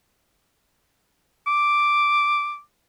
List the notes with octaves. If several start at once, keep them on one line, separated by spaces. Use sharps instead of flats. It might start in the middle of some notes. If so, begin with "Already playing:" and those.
D6